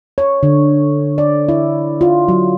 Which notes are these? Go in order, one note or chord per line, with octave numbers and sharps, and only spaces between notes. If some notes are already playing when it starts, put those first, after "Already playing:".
C#5
D3
D5
E4
F4
F#3